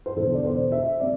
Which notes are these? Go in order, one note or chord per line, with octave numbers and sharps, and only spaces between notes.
C5
E1 E2 D3 A4
D5
C5
E5
C3 D5